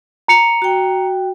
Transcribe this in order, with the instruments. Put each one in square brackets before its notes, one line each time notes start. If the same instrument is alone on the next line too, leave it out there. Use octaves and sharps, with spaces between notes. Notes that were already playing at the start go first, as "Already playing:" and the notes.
[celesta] A#5 C#7 F7
[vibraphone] F#4 G5